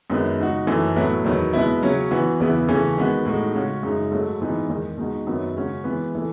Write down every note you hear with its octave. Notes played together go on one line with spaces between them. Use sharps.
F#2 D#3 G#3 B3
C#3 G#3 D#4 F#4
F#2 E3 A3
A2 F#3 B3 E4
E2 D#3 F#3 B3
B2 G#3 B3 E4
C#3 F#3 C#4
E3 B3 F#4
E2 C#3 E3 B3 E4
C#3 E3 A3 C#4
D#3 G#3 B3 F#4
A2 G#3 D#4 F#4
C#3 G#3 C#4 F#4
F#2 C#3 G#3 D#4
G#2 F#3 A3
G#2 E3 B3 D#4
E2 D#3 G#3
B2 G#3 D#4 F#4
F#2 D#3 F#3 B3
C#3 G#3 C#4 F#4
E3 G#3 B3
E3 A3